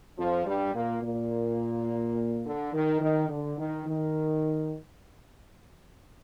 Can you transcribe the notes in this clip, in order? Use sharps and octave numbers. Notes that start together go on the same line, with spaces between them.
F2 F3
G2 G3
A#2 A#3
A#2 A#3
D3
D#3
D#3
D3
D#3
D#3